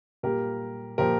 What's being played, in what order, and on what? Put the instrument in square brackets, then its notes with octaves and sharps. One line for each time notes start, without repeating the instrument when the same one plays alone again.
[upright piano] A#2 G3 G4 A#4
A#2 F3 G4 A#4